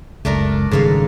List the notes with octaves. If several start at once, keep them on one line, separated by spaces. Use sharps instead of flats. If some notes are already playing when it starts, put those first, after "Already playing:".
F#1 C#2 A3 D4 A#4
G#1 G#2 C#3 G3 A4 F5